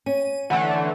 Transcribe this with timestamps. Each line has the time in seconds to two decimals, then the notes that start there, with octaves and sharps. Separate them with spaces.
0.06 C#4 D#7
0.50 D3 E3 A3 F#5